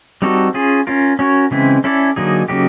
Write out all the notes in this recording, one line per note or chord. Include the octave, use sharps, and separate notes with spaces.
G3 C4 D#4 F#4 A4
C#4 F4 G#4
C#4 F4 A#4
C#4 F#4 A#4 C#5
C#3 E3 G#3 C4 E4
C#4 E4 A4 D5
D3 F#3 A#3 D#4 G#4
C#3 F#3 A#3 D#4 G4